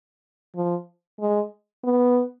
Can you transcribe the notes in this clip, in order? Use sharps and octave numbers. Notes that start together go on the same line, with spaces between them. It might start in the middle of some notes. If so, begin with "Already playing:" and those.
F3
G#3
B3